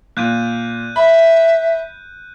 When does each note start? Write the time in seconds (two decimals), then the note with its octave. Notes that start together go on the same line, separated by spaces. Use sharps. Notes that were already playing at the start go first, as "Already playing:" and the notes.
0.17 A#2 F#6 G6 D#7
0.96 E5 B5